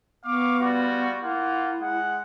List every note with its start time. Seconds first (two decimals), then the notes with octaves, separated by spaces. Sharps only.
0.25 B3 F5 C#6 D6
0.60 G3 F4 F#4
1.22 A#3 E4 F4 F#5
1.81 G#3 F#5